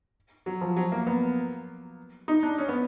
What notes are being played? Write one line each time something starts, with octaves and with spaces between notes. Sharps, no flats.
F#3
F3
F#3
A#3
B3
D#4
D4
C#4
B3